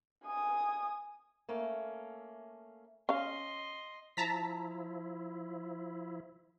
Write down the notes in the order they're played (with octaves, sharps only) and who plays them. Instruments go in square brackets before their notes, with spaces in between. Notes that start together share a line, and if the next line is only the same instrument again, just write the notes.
[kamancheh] G#5 D#6
[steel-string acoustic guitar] A3 A#3 C#4
[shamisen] C#4 F5 [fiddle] D#5 C6
[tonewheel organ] F3 E4 [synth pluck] A5 A#5 B6